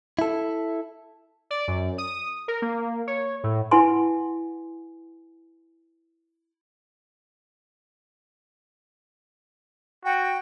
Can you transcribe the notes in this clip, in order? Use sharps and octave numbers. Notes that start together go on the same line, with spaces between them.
E4 A4
D5
F#2
D#6
A#4
A#3
C#5
A2
E4 B4 F#5 G#5 A5 C6
F#4 G5